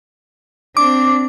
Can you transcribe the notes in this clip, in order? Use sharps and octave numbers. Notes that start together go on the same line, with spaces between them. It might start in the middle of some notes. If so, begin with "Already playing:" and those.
C4 D4 D6